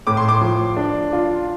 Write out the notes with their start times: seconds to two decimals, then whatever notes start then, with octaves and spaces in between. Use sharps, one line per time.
0.07 A2 D6
0.17 C6
0.29 D6
0.41 F3
0.77 D4
1.13 F4